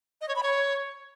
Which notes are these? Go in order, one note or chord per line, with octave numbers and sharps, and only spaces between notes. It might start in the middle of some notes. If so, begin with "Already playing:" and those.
D#5
C#5
B5
C#5